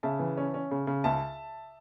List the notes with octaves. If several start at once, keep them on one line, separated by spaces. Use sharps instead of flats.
C#3 E5 A5
E3
C#4
C#4
C#3
C#3
C#2 E5 A5